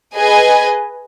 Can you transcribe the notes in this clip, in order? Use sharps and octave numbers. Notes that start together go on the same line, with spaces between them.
G#4 B4 D#5 G#5